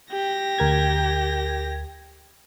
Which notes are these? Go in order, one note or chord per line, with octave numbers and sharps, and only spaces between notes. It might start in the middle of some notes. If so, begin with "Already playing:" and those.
G4 A#6
D2 A#4 G#6